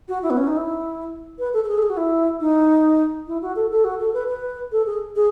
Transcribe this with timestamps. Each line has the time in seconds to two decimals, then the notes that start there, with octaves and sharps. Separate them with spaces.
0.08 F#4
0.23 E4
0.30 B3
0.37 C#4
0.47 D#4
0.57 E4
1.39 B4
1.53 A4
1.64 A4
1.68 G#4
1.78 A4
1.82 G#4
1.90 F#4
1.97 E4
2.40 D#4
3.28 E4
3.42 F#4
3.56 A4
3.71 A4
3.84 F#4
3.99 A4
4.13 B4
4.28 B4
4.72 A4
4.86 G#4
5.16 G#4